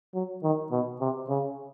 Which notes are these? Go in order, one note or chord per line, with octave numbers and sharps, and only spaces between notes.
F#3
D#3
B2
C3
C#3